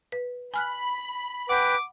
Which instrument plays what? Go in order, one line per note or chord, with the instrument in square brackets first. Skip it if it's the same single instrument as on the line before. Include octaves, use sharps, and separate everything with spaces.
[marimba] B4
[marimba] G#5 F6 F#6 [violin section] B5
[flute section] B4 G5 [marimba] F#5 [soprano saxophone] D6